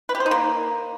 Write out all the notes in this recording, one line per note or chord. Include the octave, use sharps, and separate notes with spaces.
B4
G4
C5
D#4
A#3